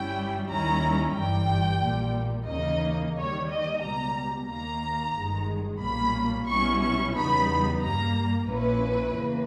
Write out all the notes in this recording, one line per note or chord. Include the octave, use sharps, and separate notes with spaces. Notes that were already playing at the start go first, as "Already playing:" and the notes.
Already playing: G1 G2 G3 C#4 E4 G5
D#2 D#3 G3 C#4 E4 A#5
G1 G2 E3 G3 G5
A#1 A#2 G3
D#2 C#3 E3 A#3 D#4 D#5
D#2 D#3 G3 C#5
D#5
C#2 B2 G3 A#5
D#2 D#3 A#3 A#5
G1 G2 D#3 G#3
B1 A#2 G3 A#3 C#4 B5
B1 B2 G3 C#4 E4 C#6
C#6
E2 C#3 G3 B3 D#4 B5
G2 G3 A#3 A#5
A#1 A#2 A#3 C#4 E4 B4
E2 C#3 E3 A#3